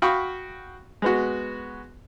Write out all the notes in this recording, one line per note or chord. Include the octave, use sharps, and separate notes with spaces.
F#4 F5 G5 B5 C#6 D#6
G#3 B3 F#4